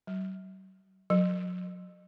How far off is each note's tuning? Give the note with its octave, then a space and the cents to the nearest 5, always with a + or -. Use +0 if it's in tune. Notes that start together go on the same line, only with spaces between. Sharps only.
F#3 +45
F#3 -35